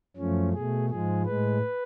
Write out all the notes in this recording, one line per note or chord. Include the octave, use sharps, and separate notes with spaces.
F#2 F3 A3 C#4
B2 A3 G#4
G#2 F3 G#3 G#4
A2 G#3 B4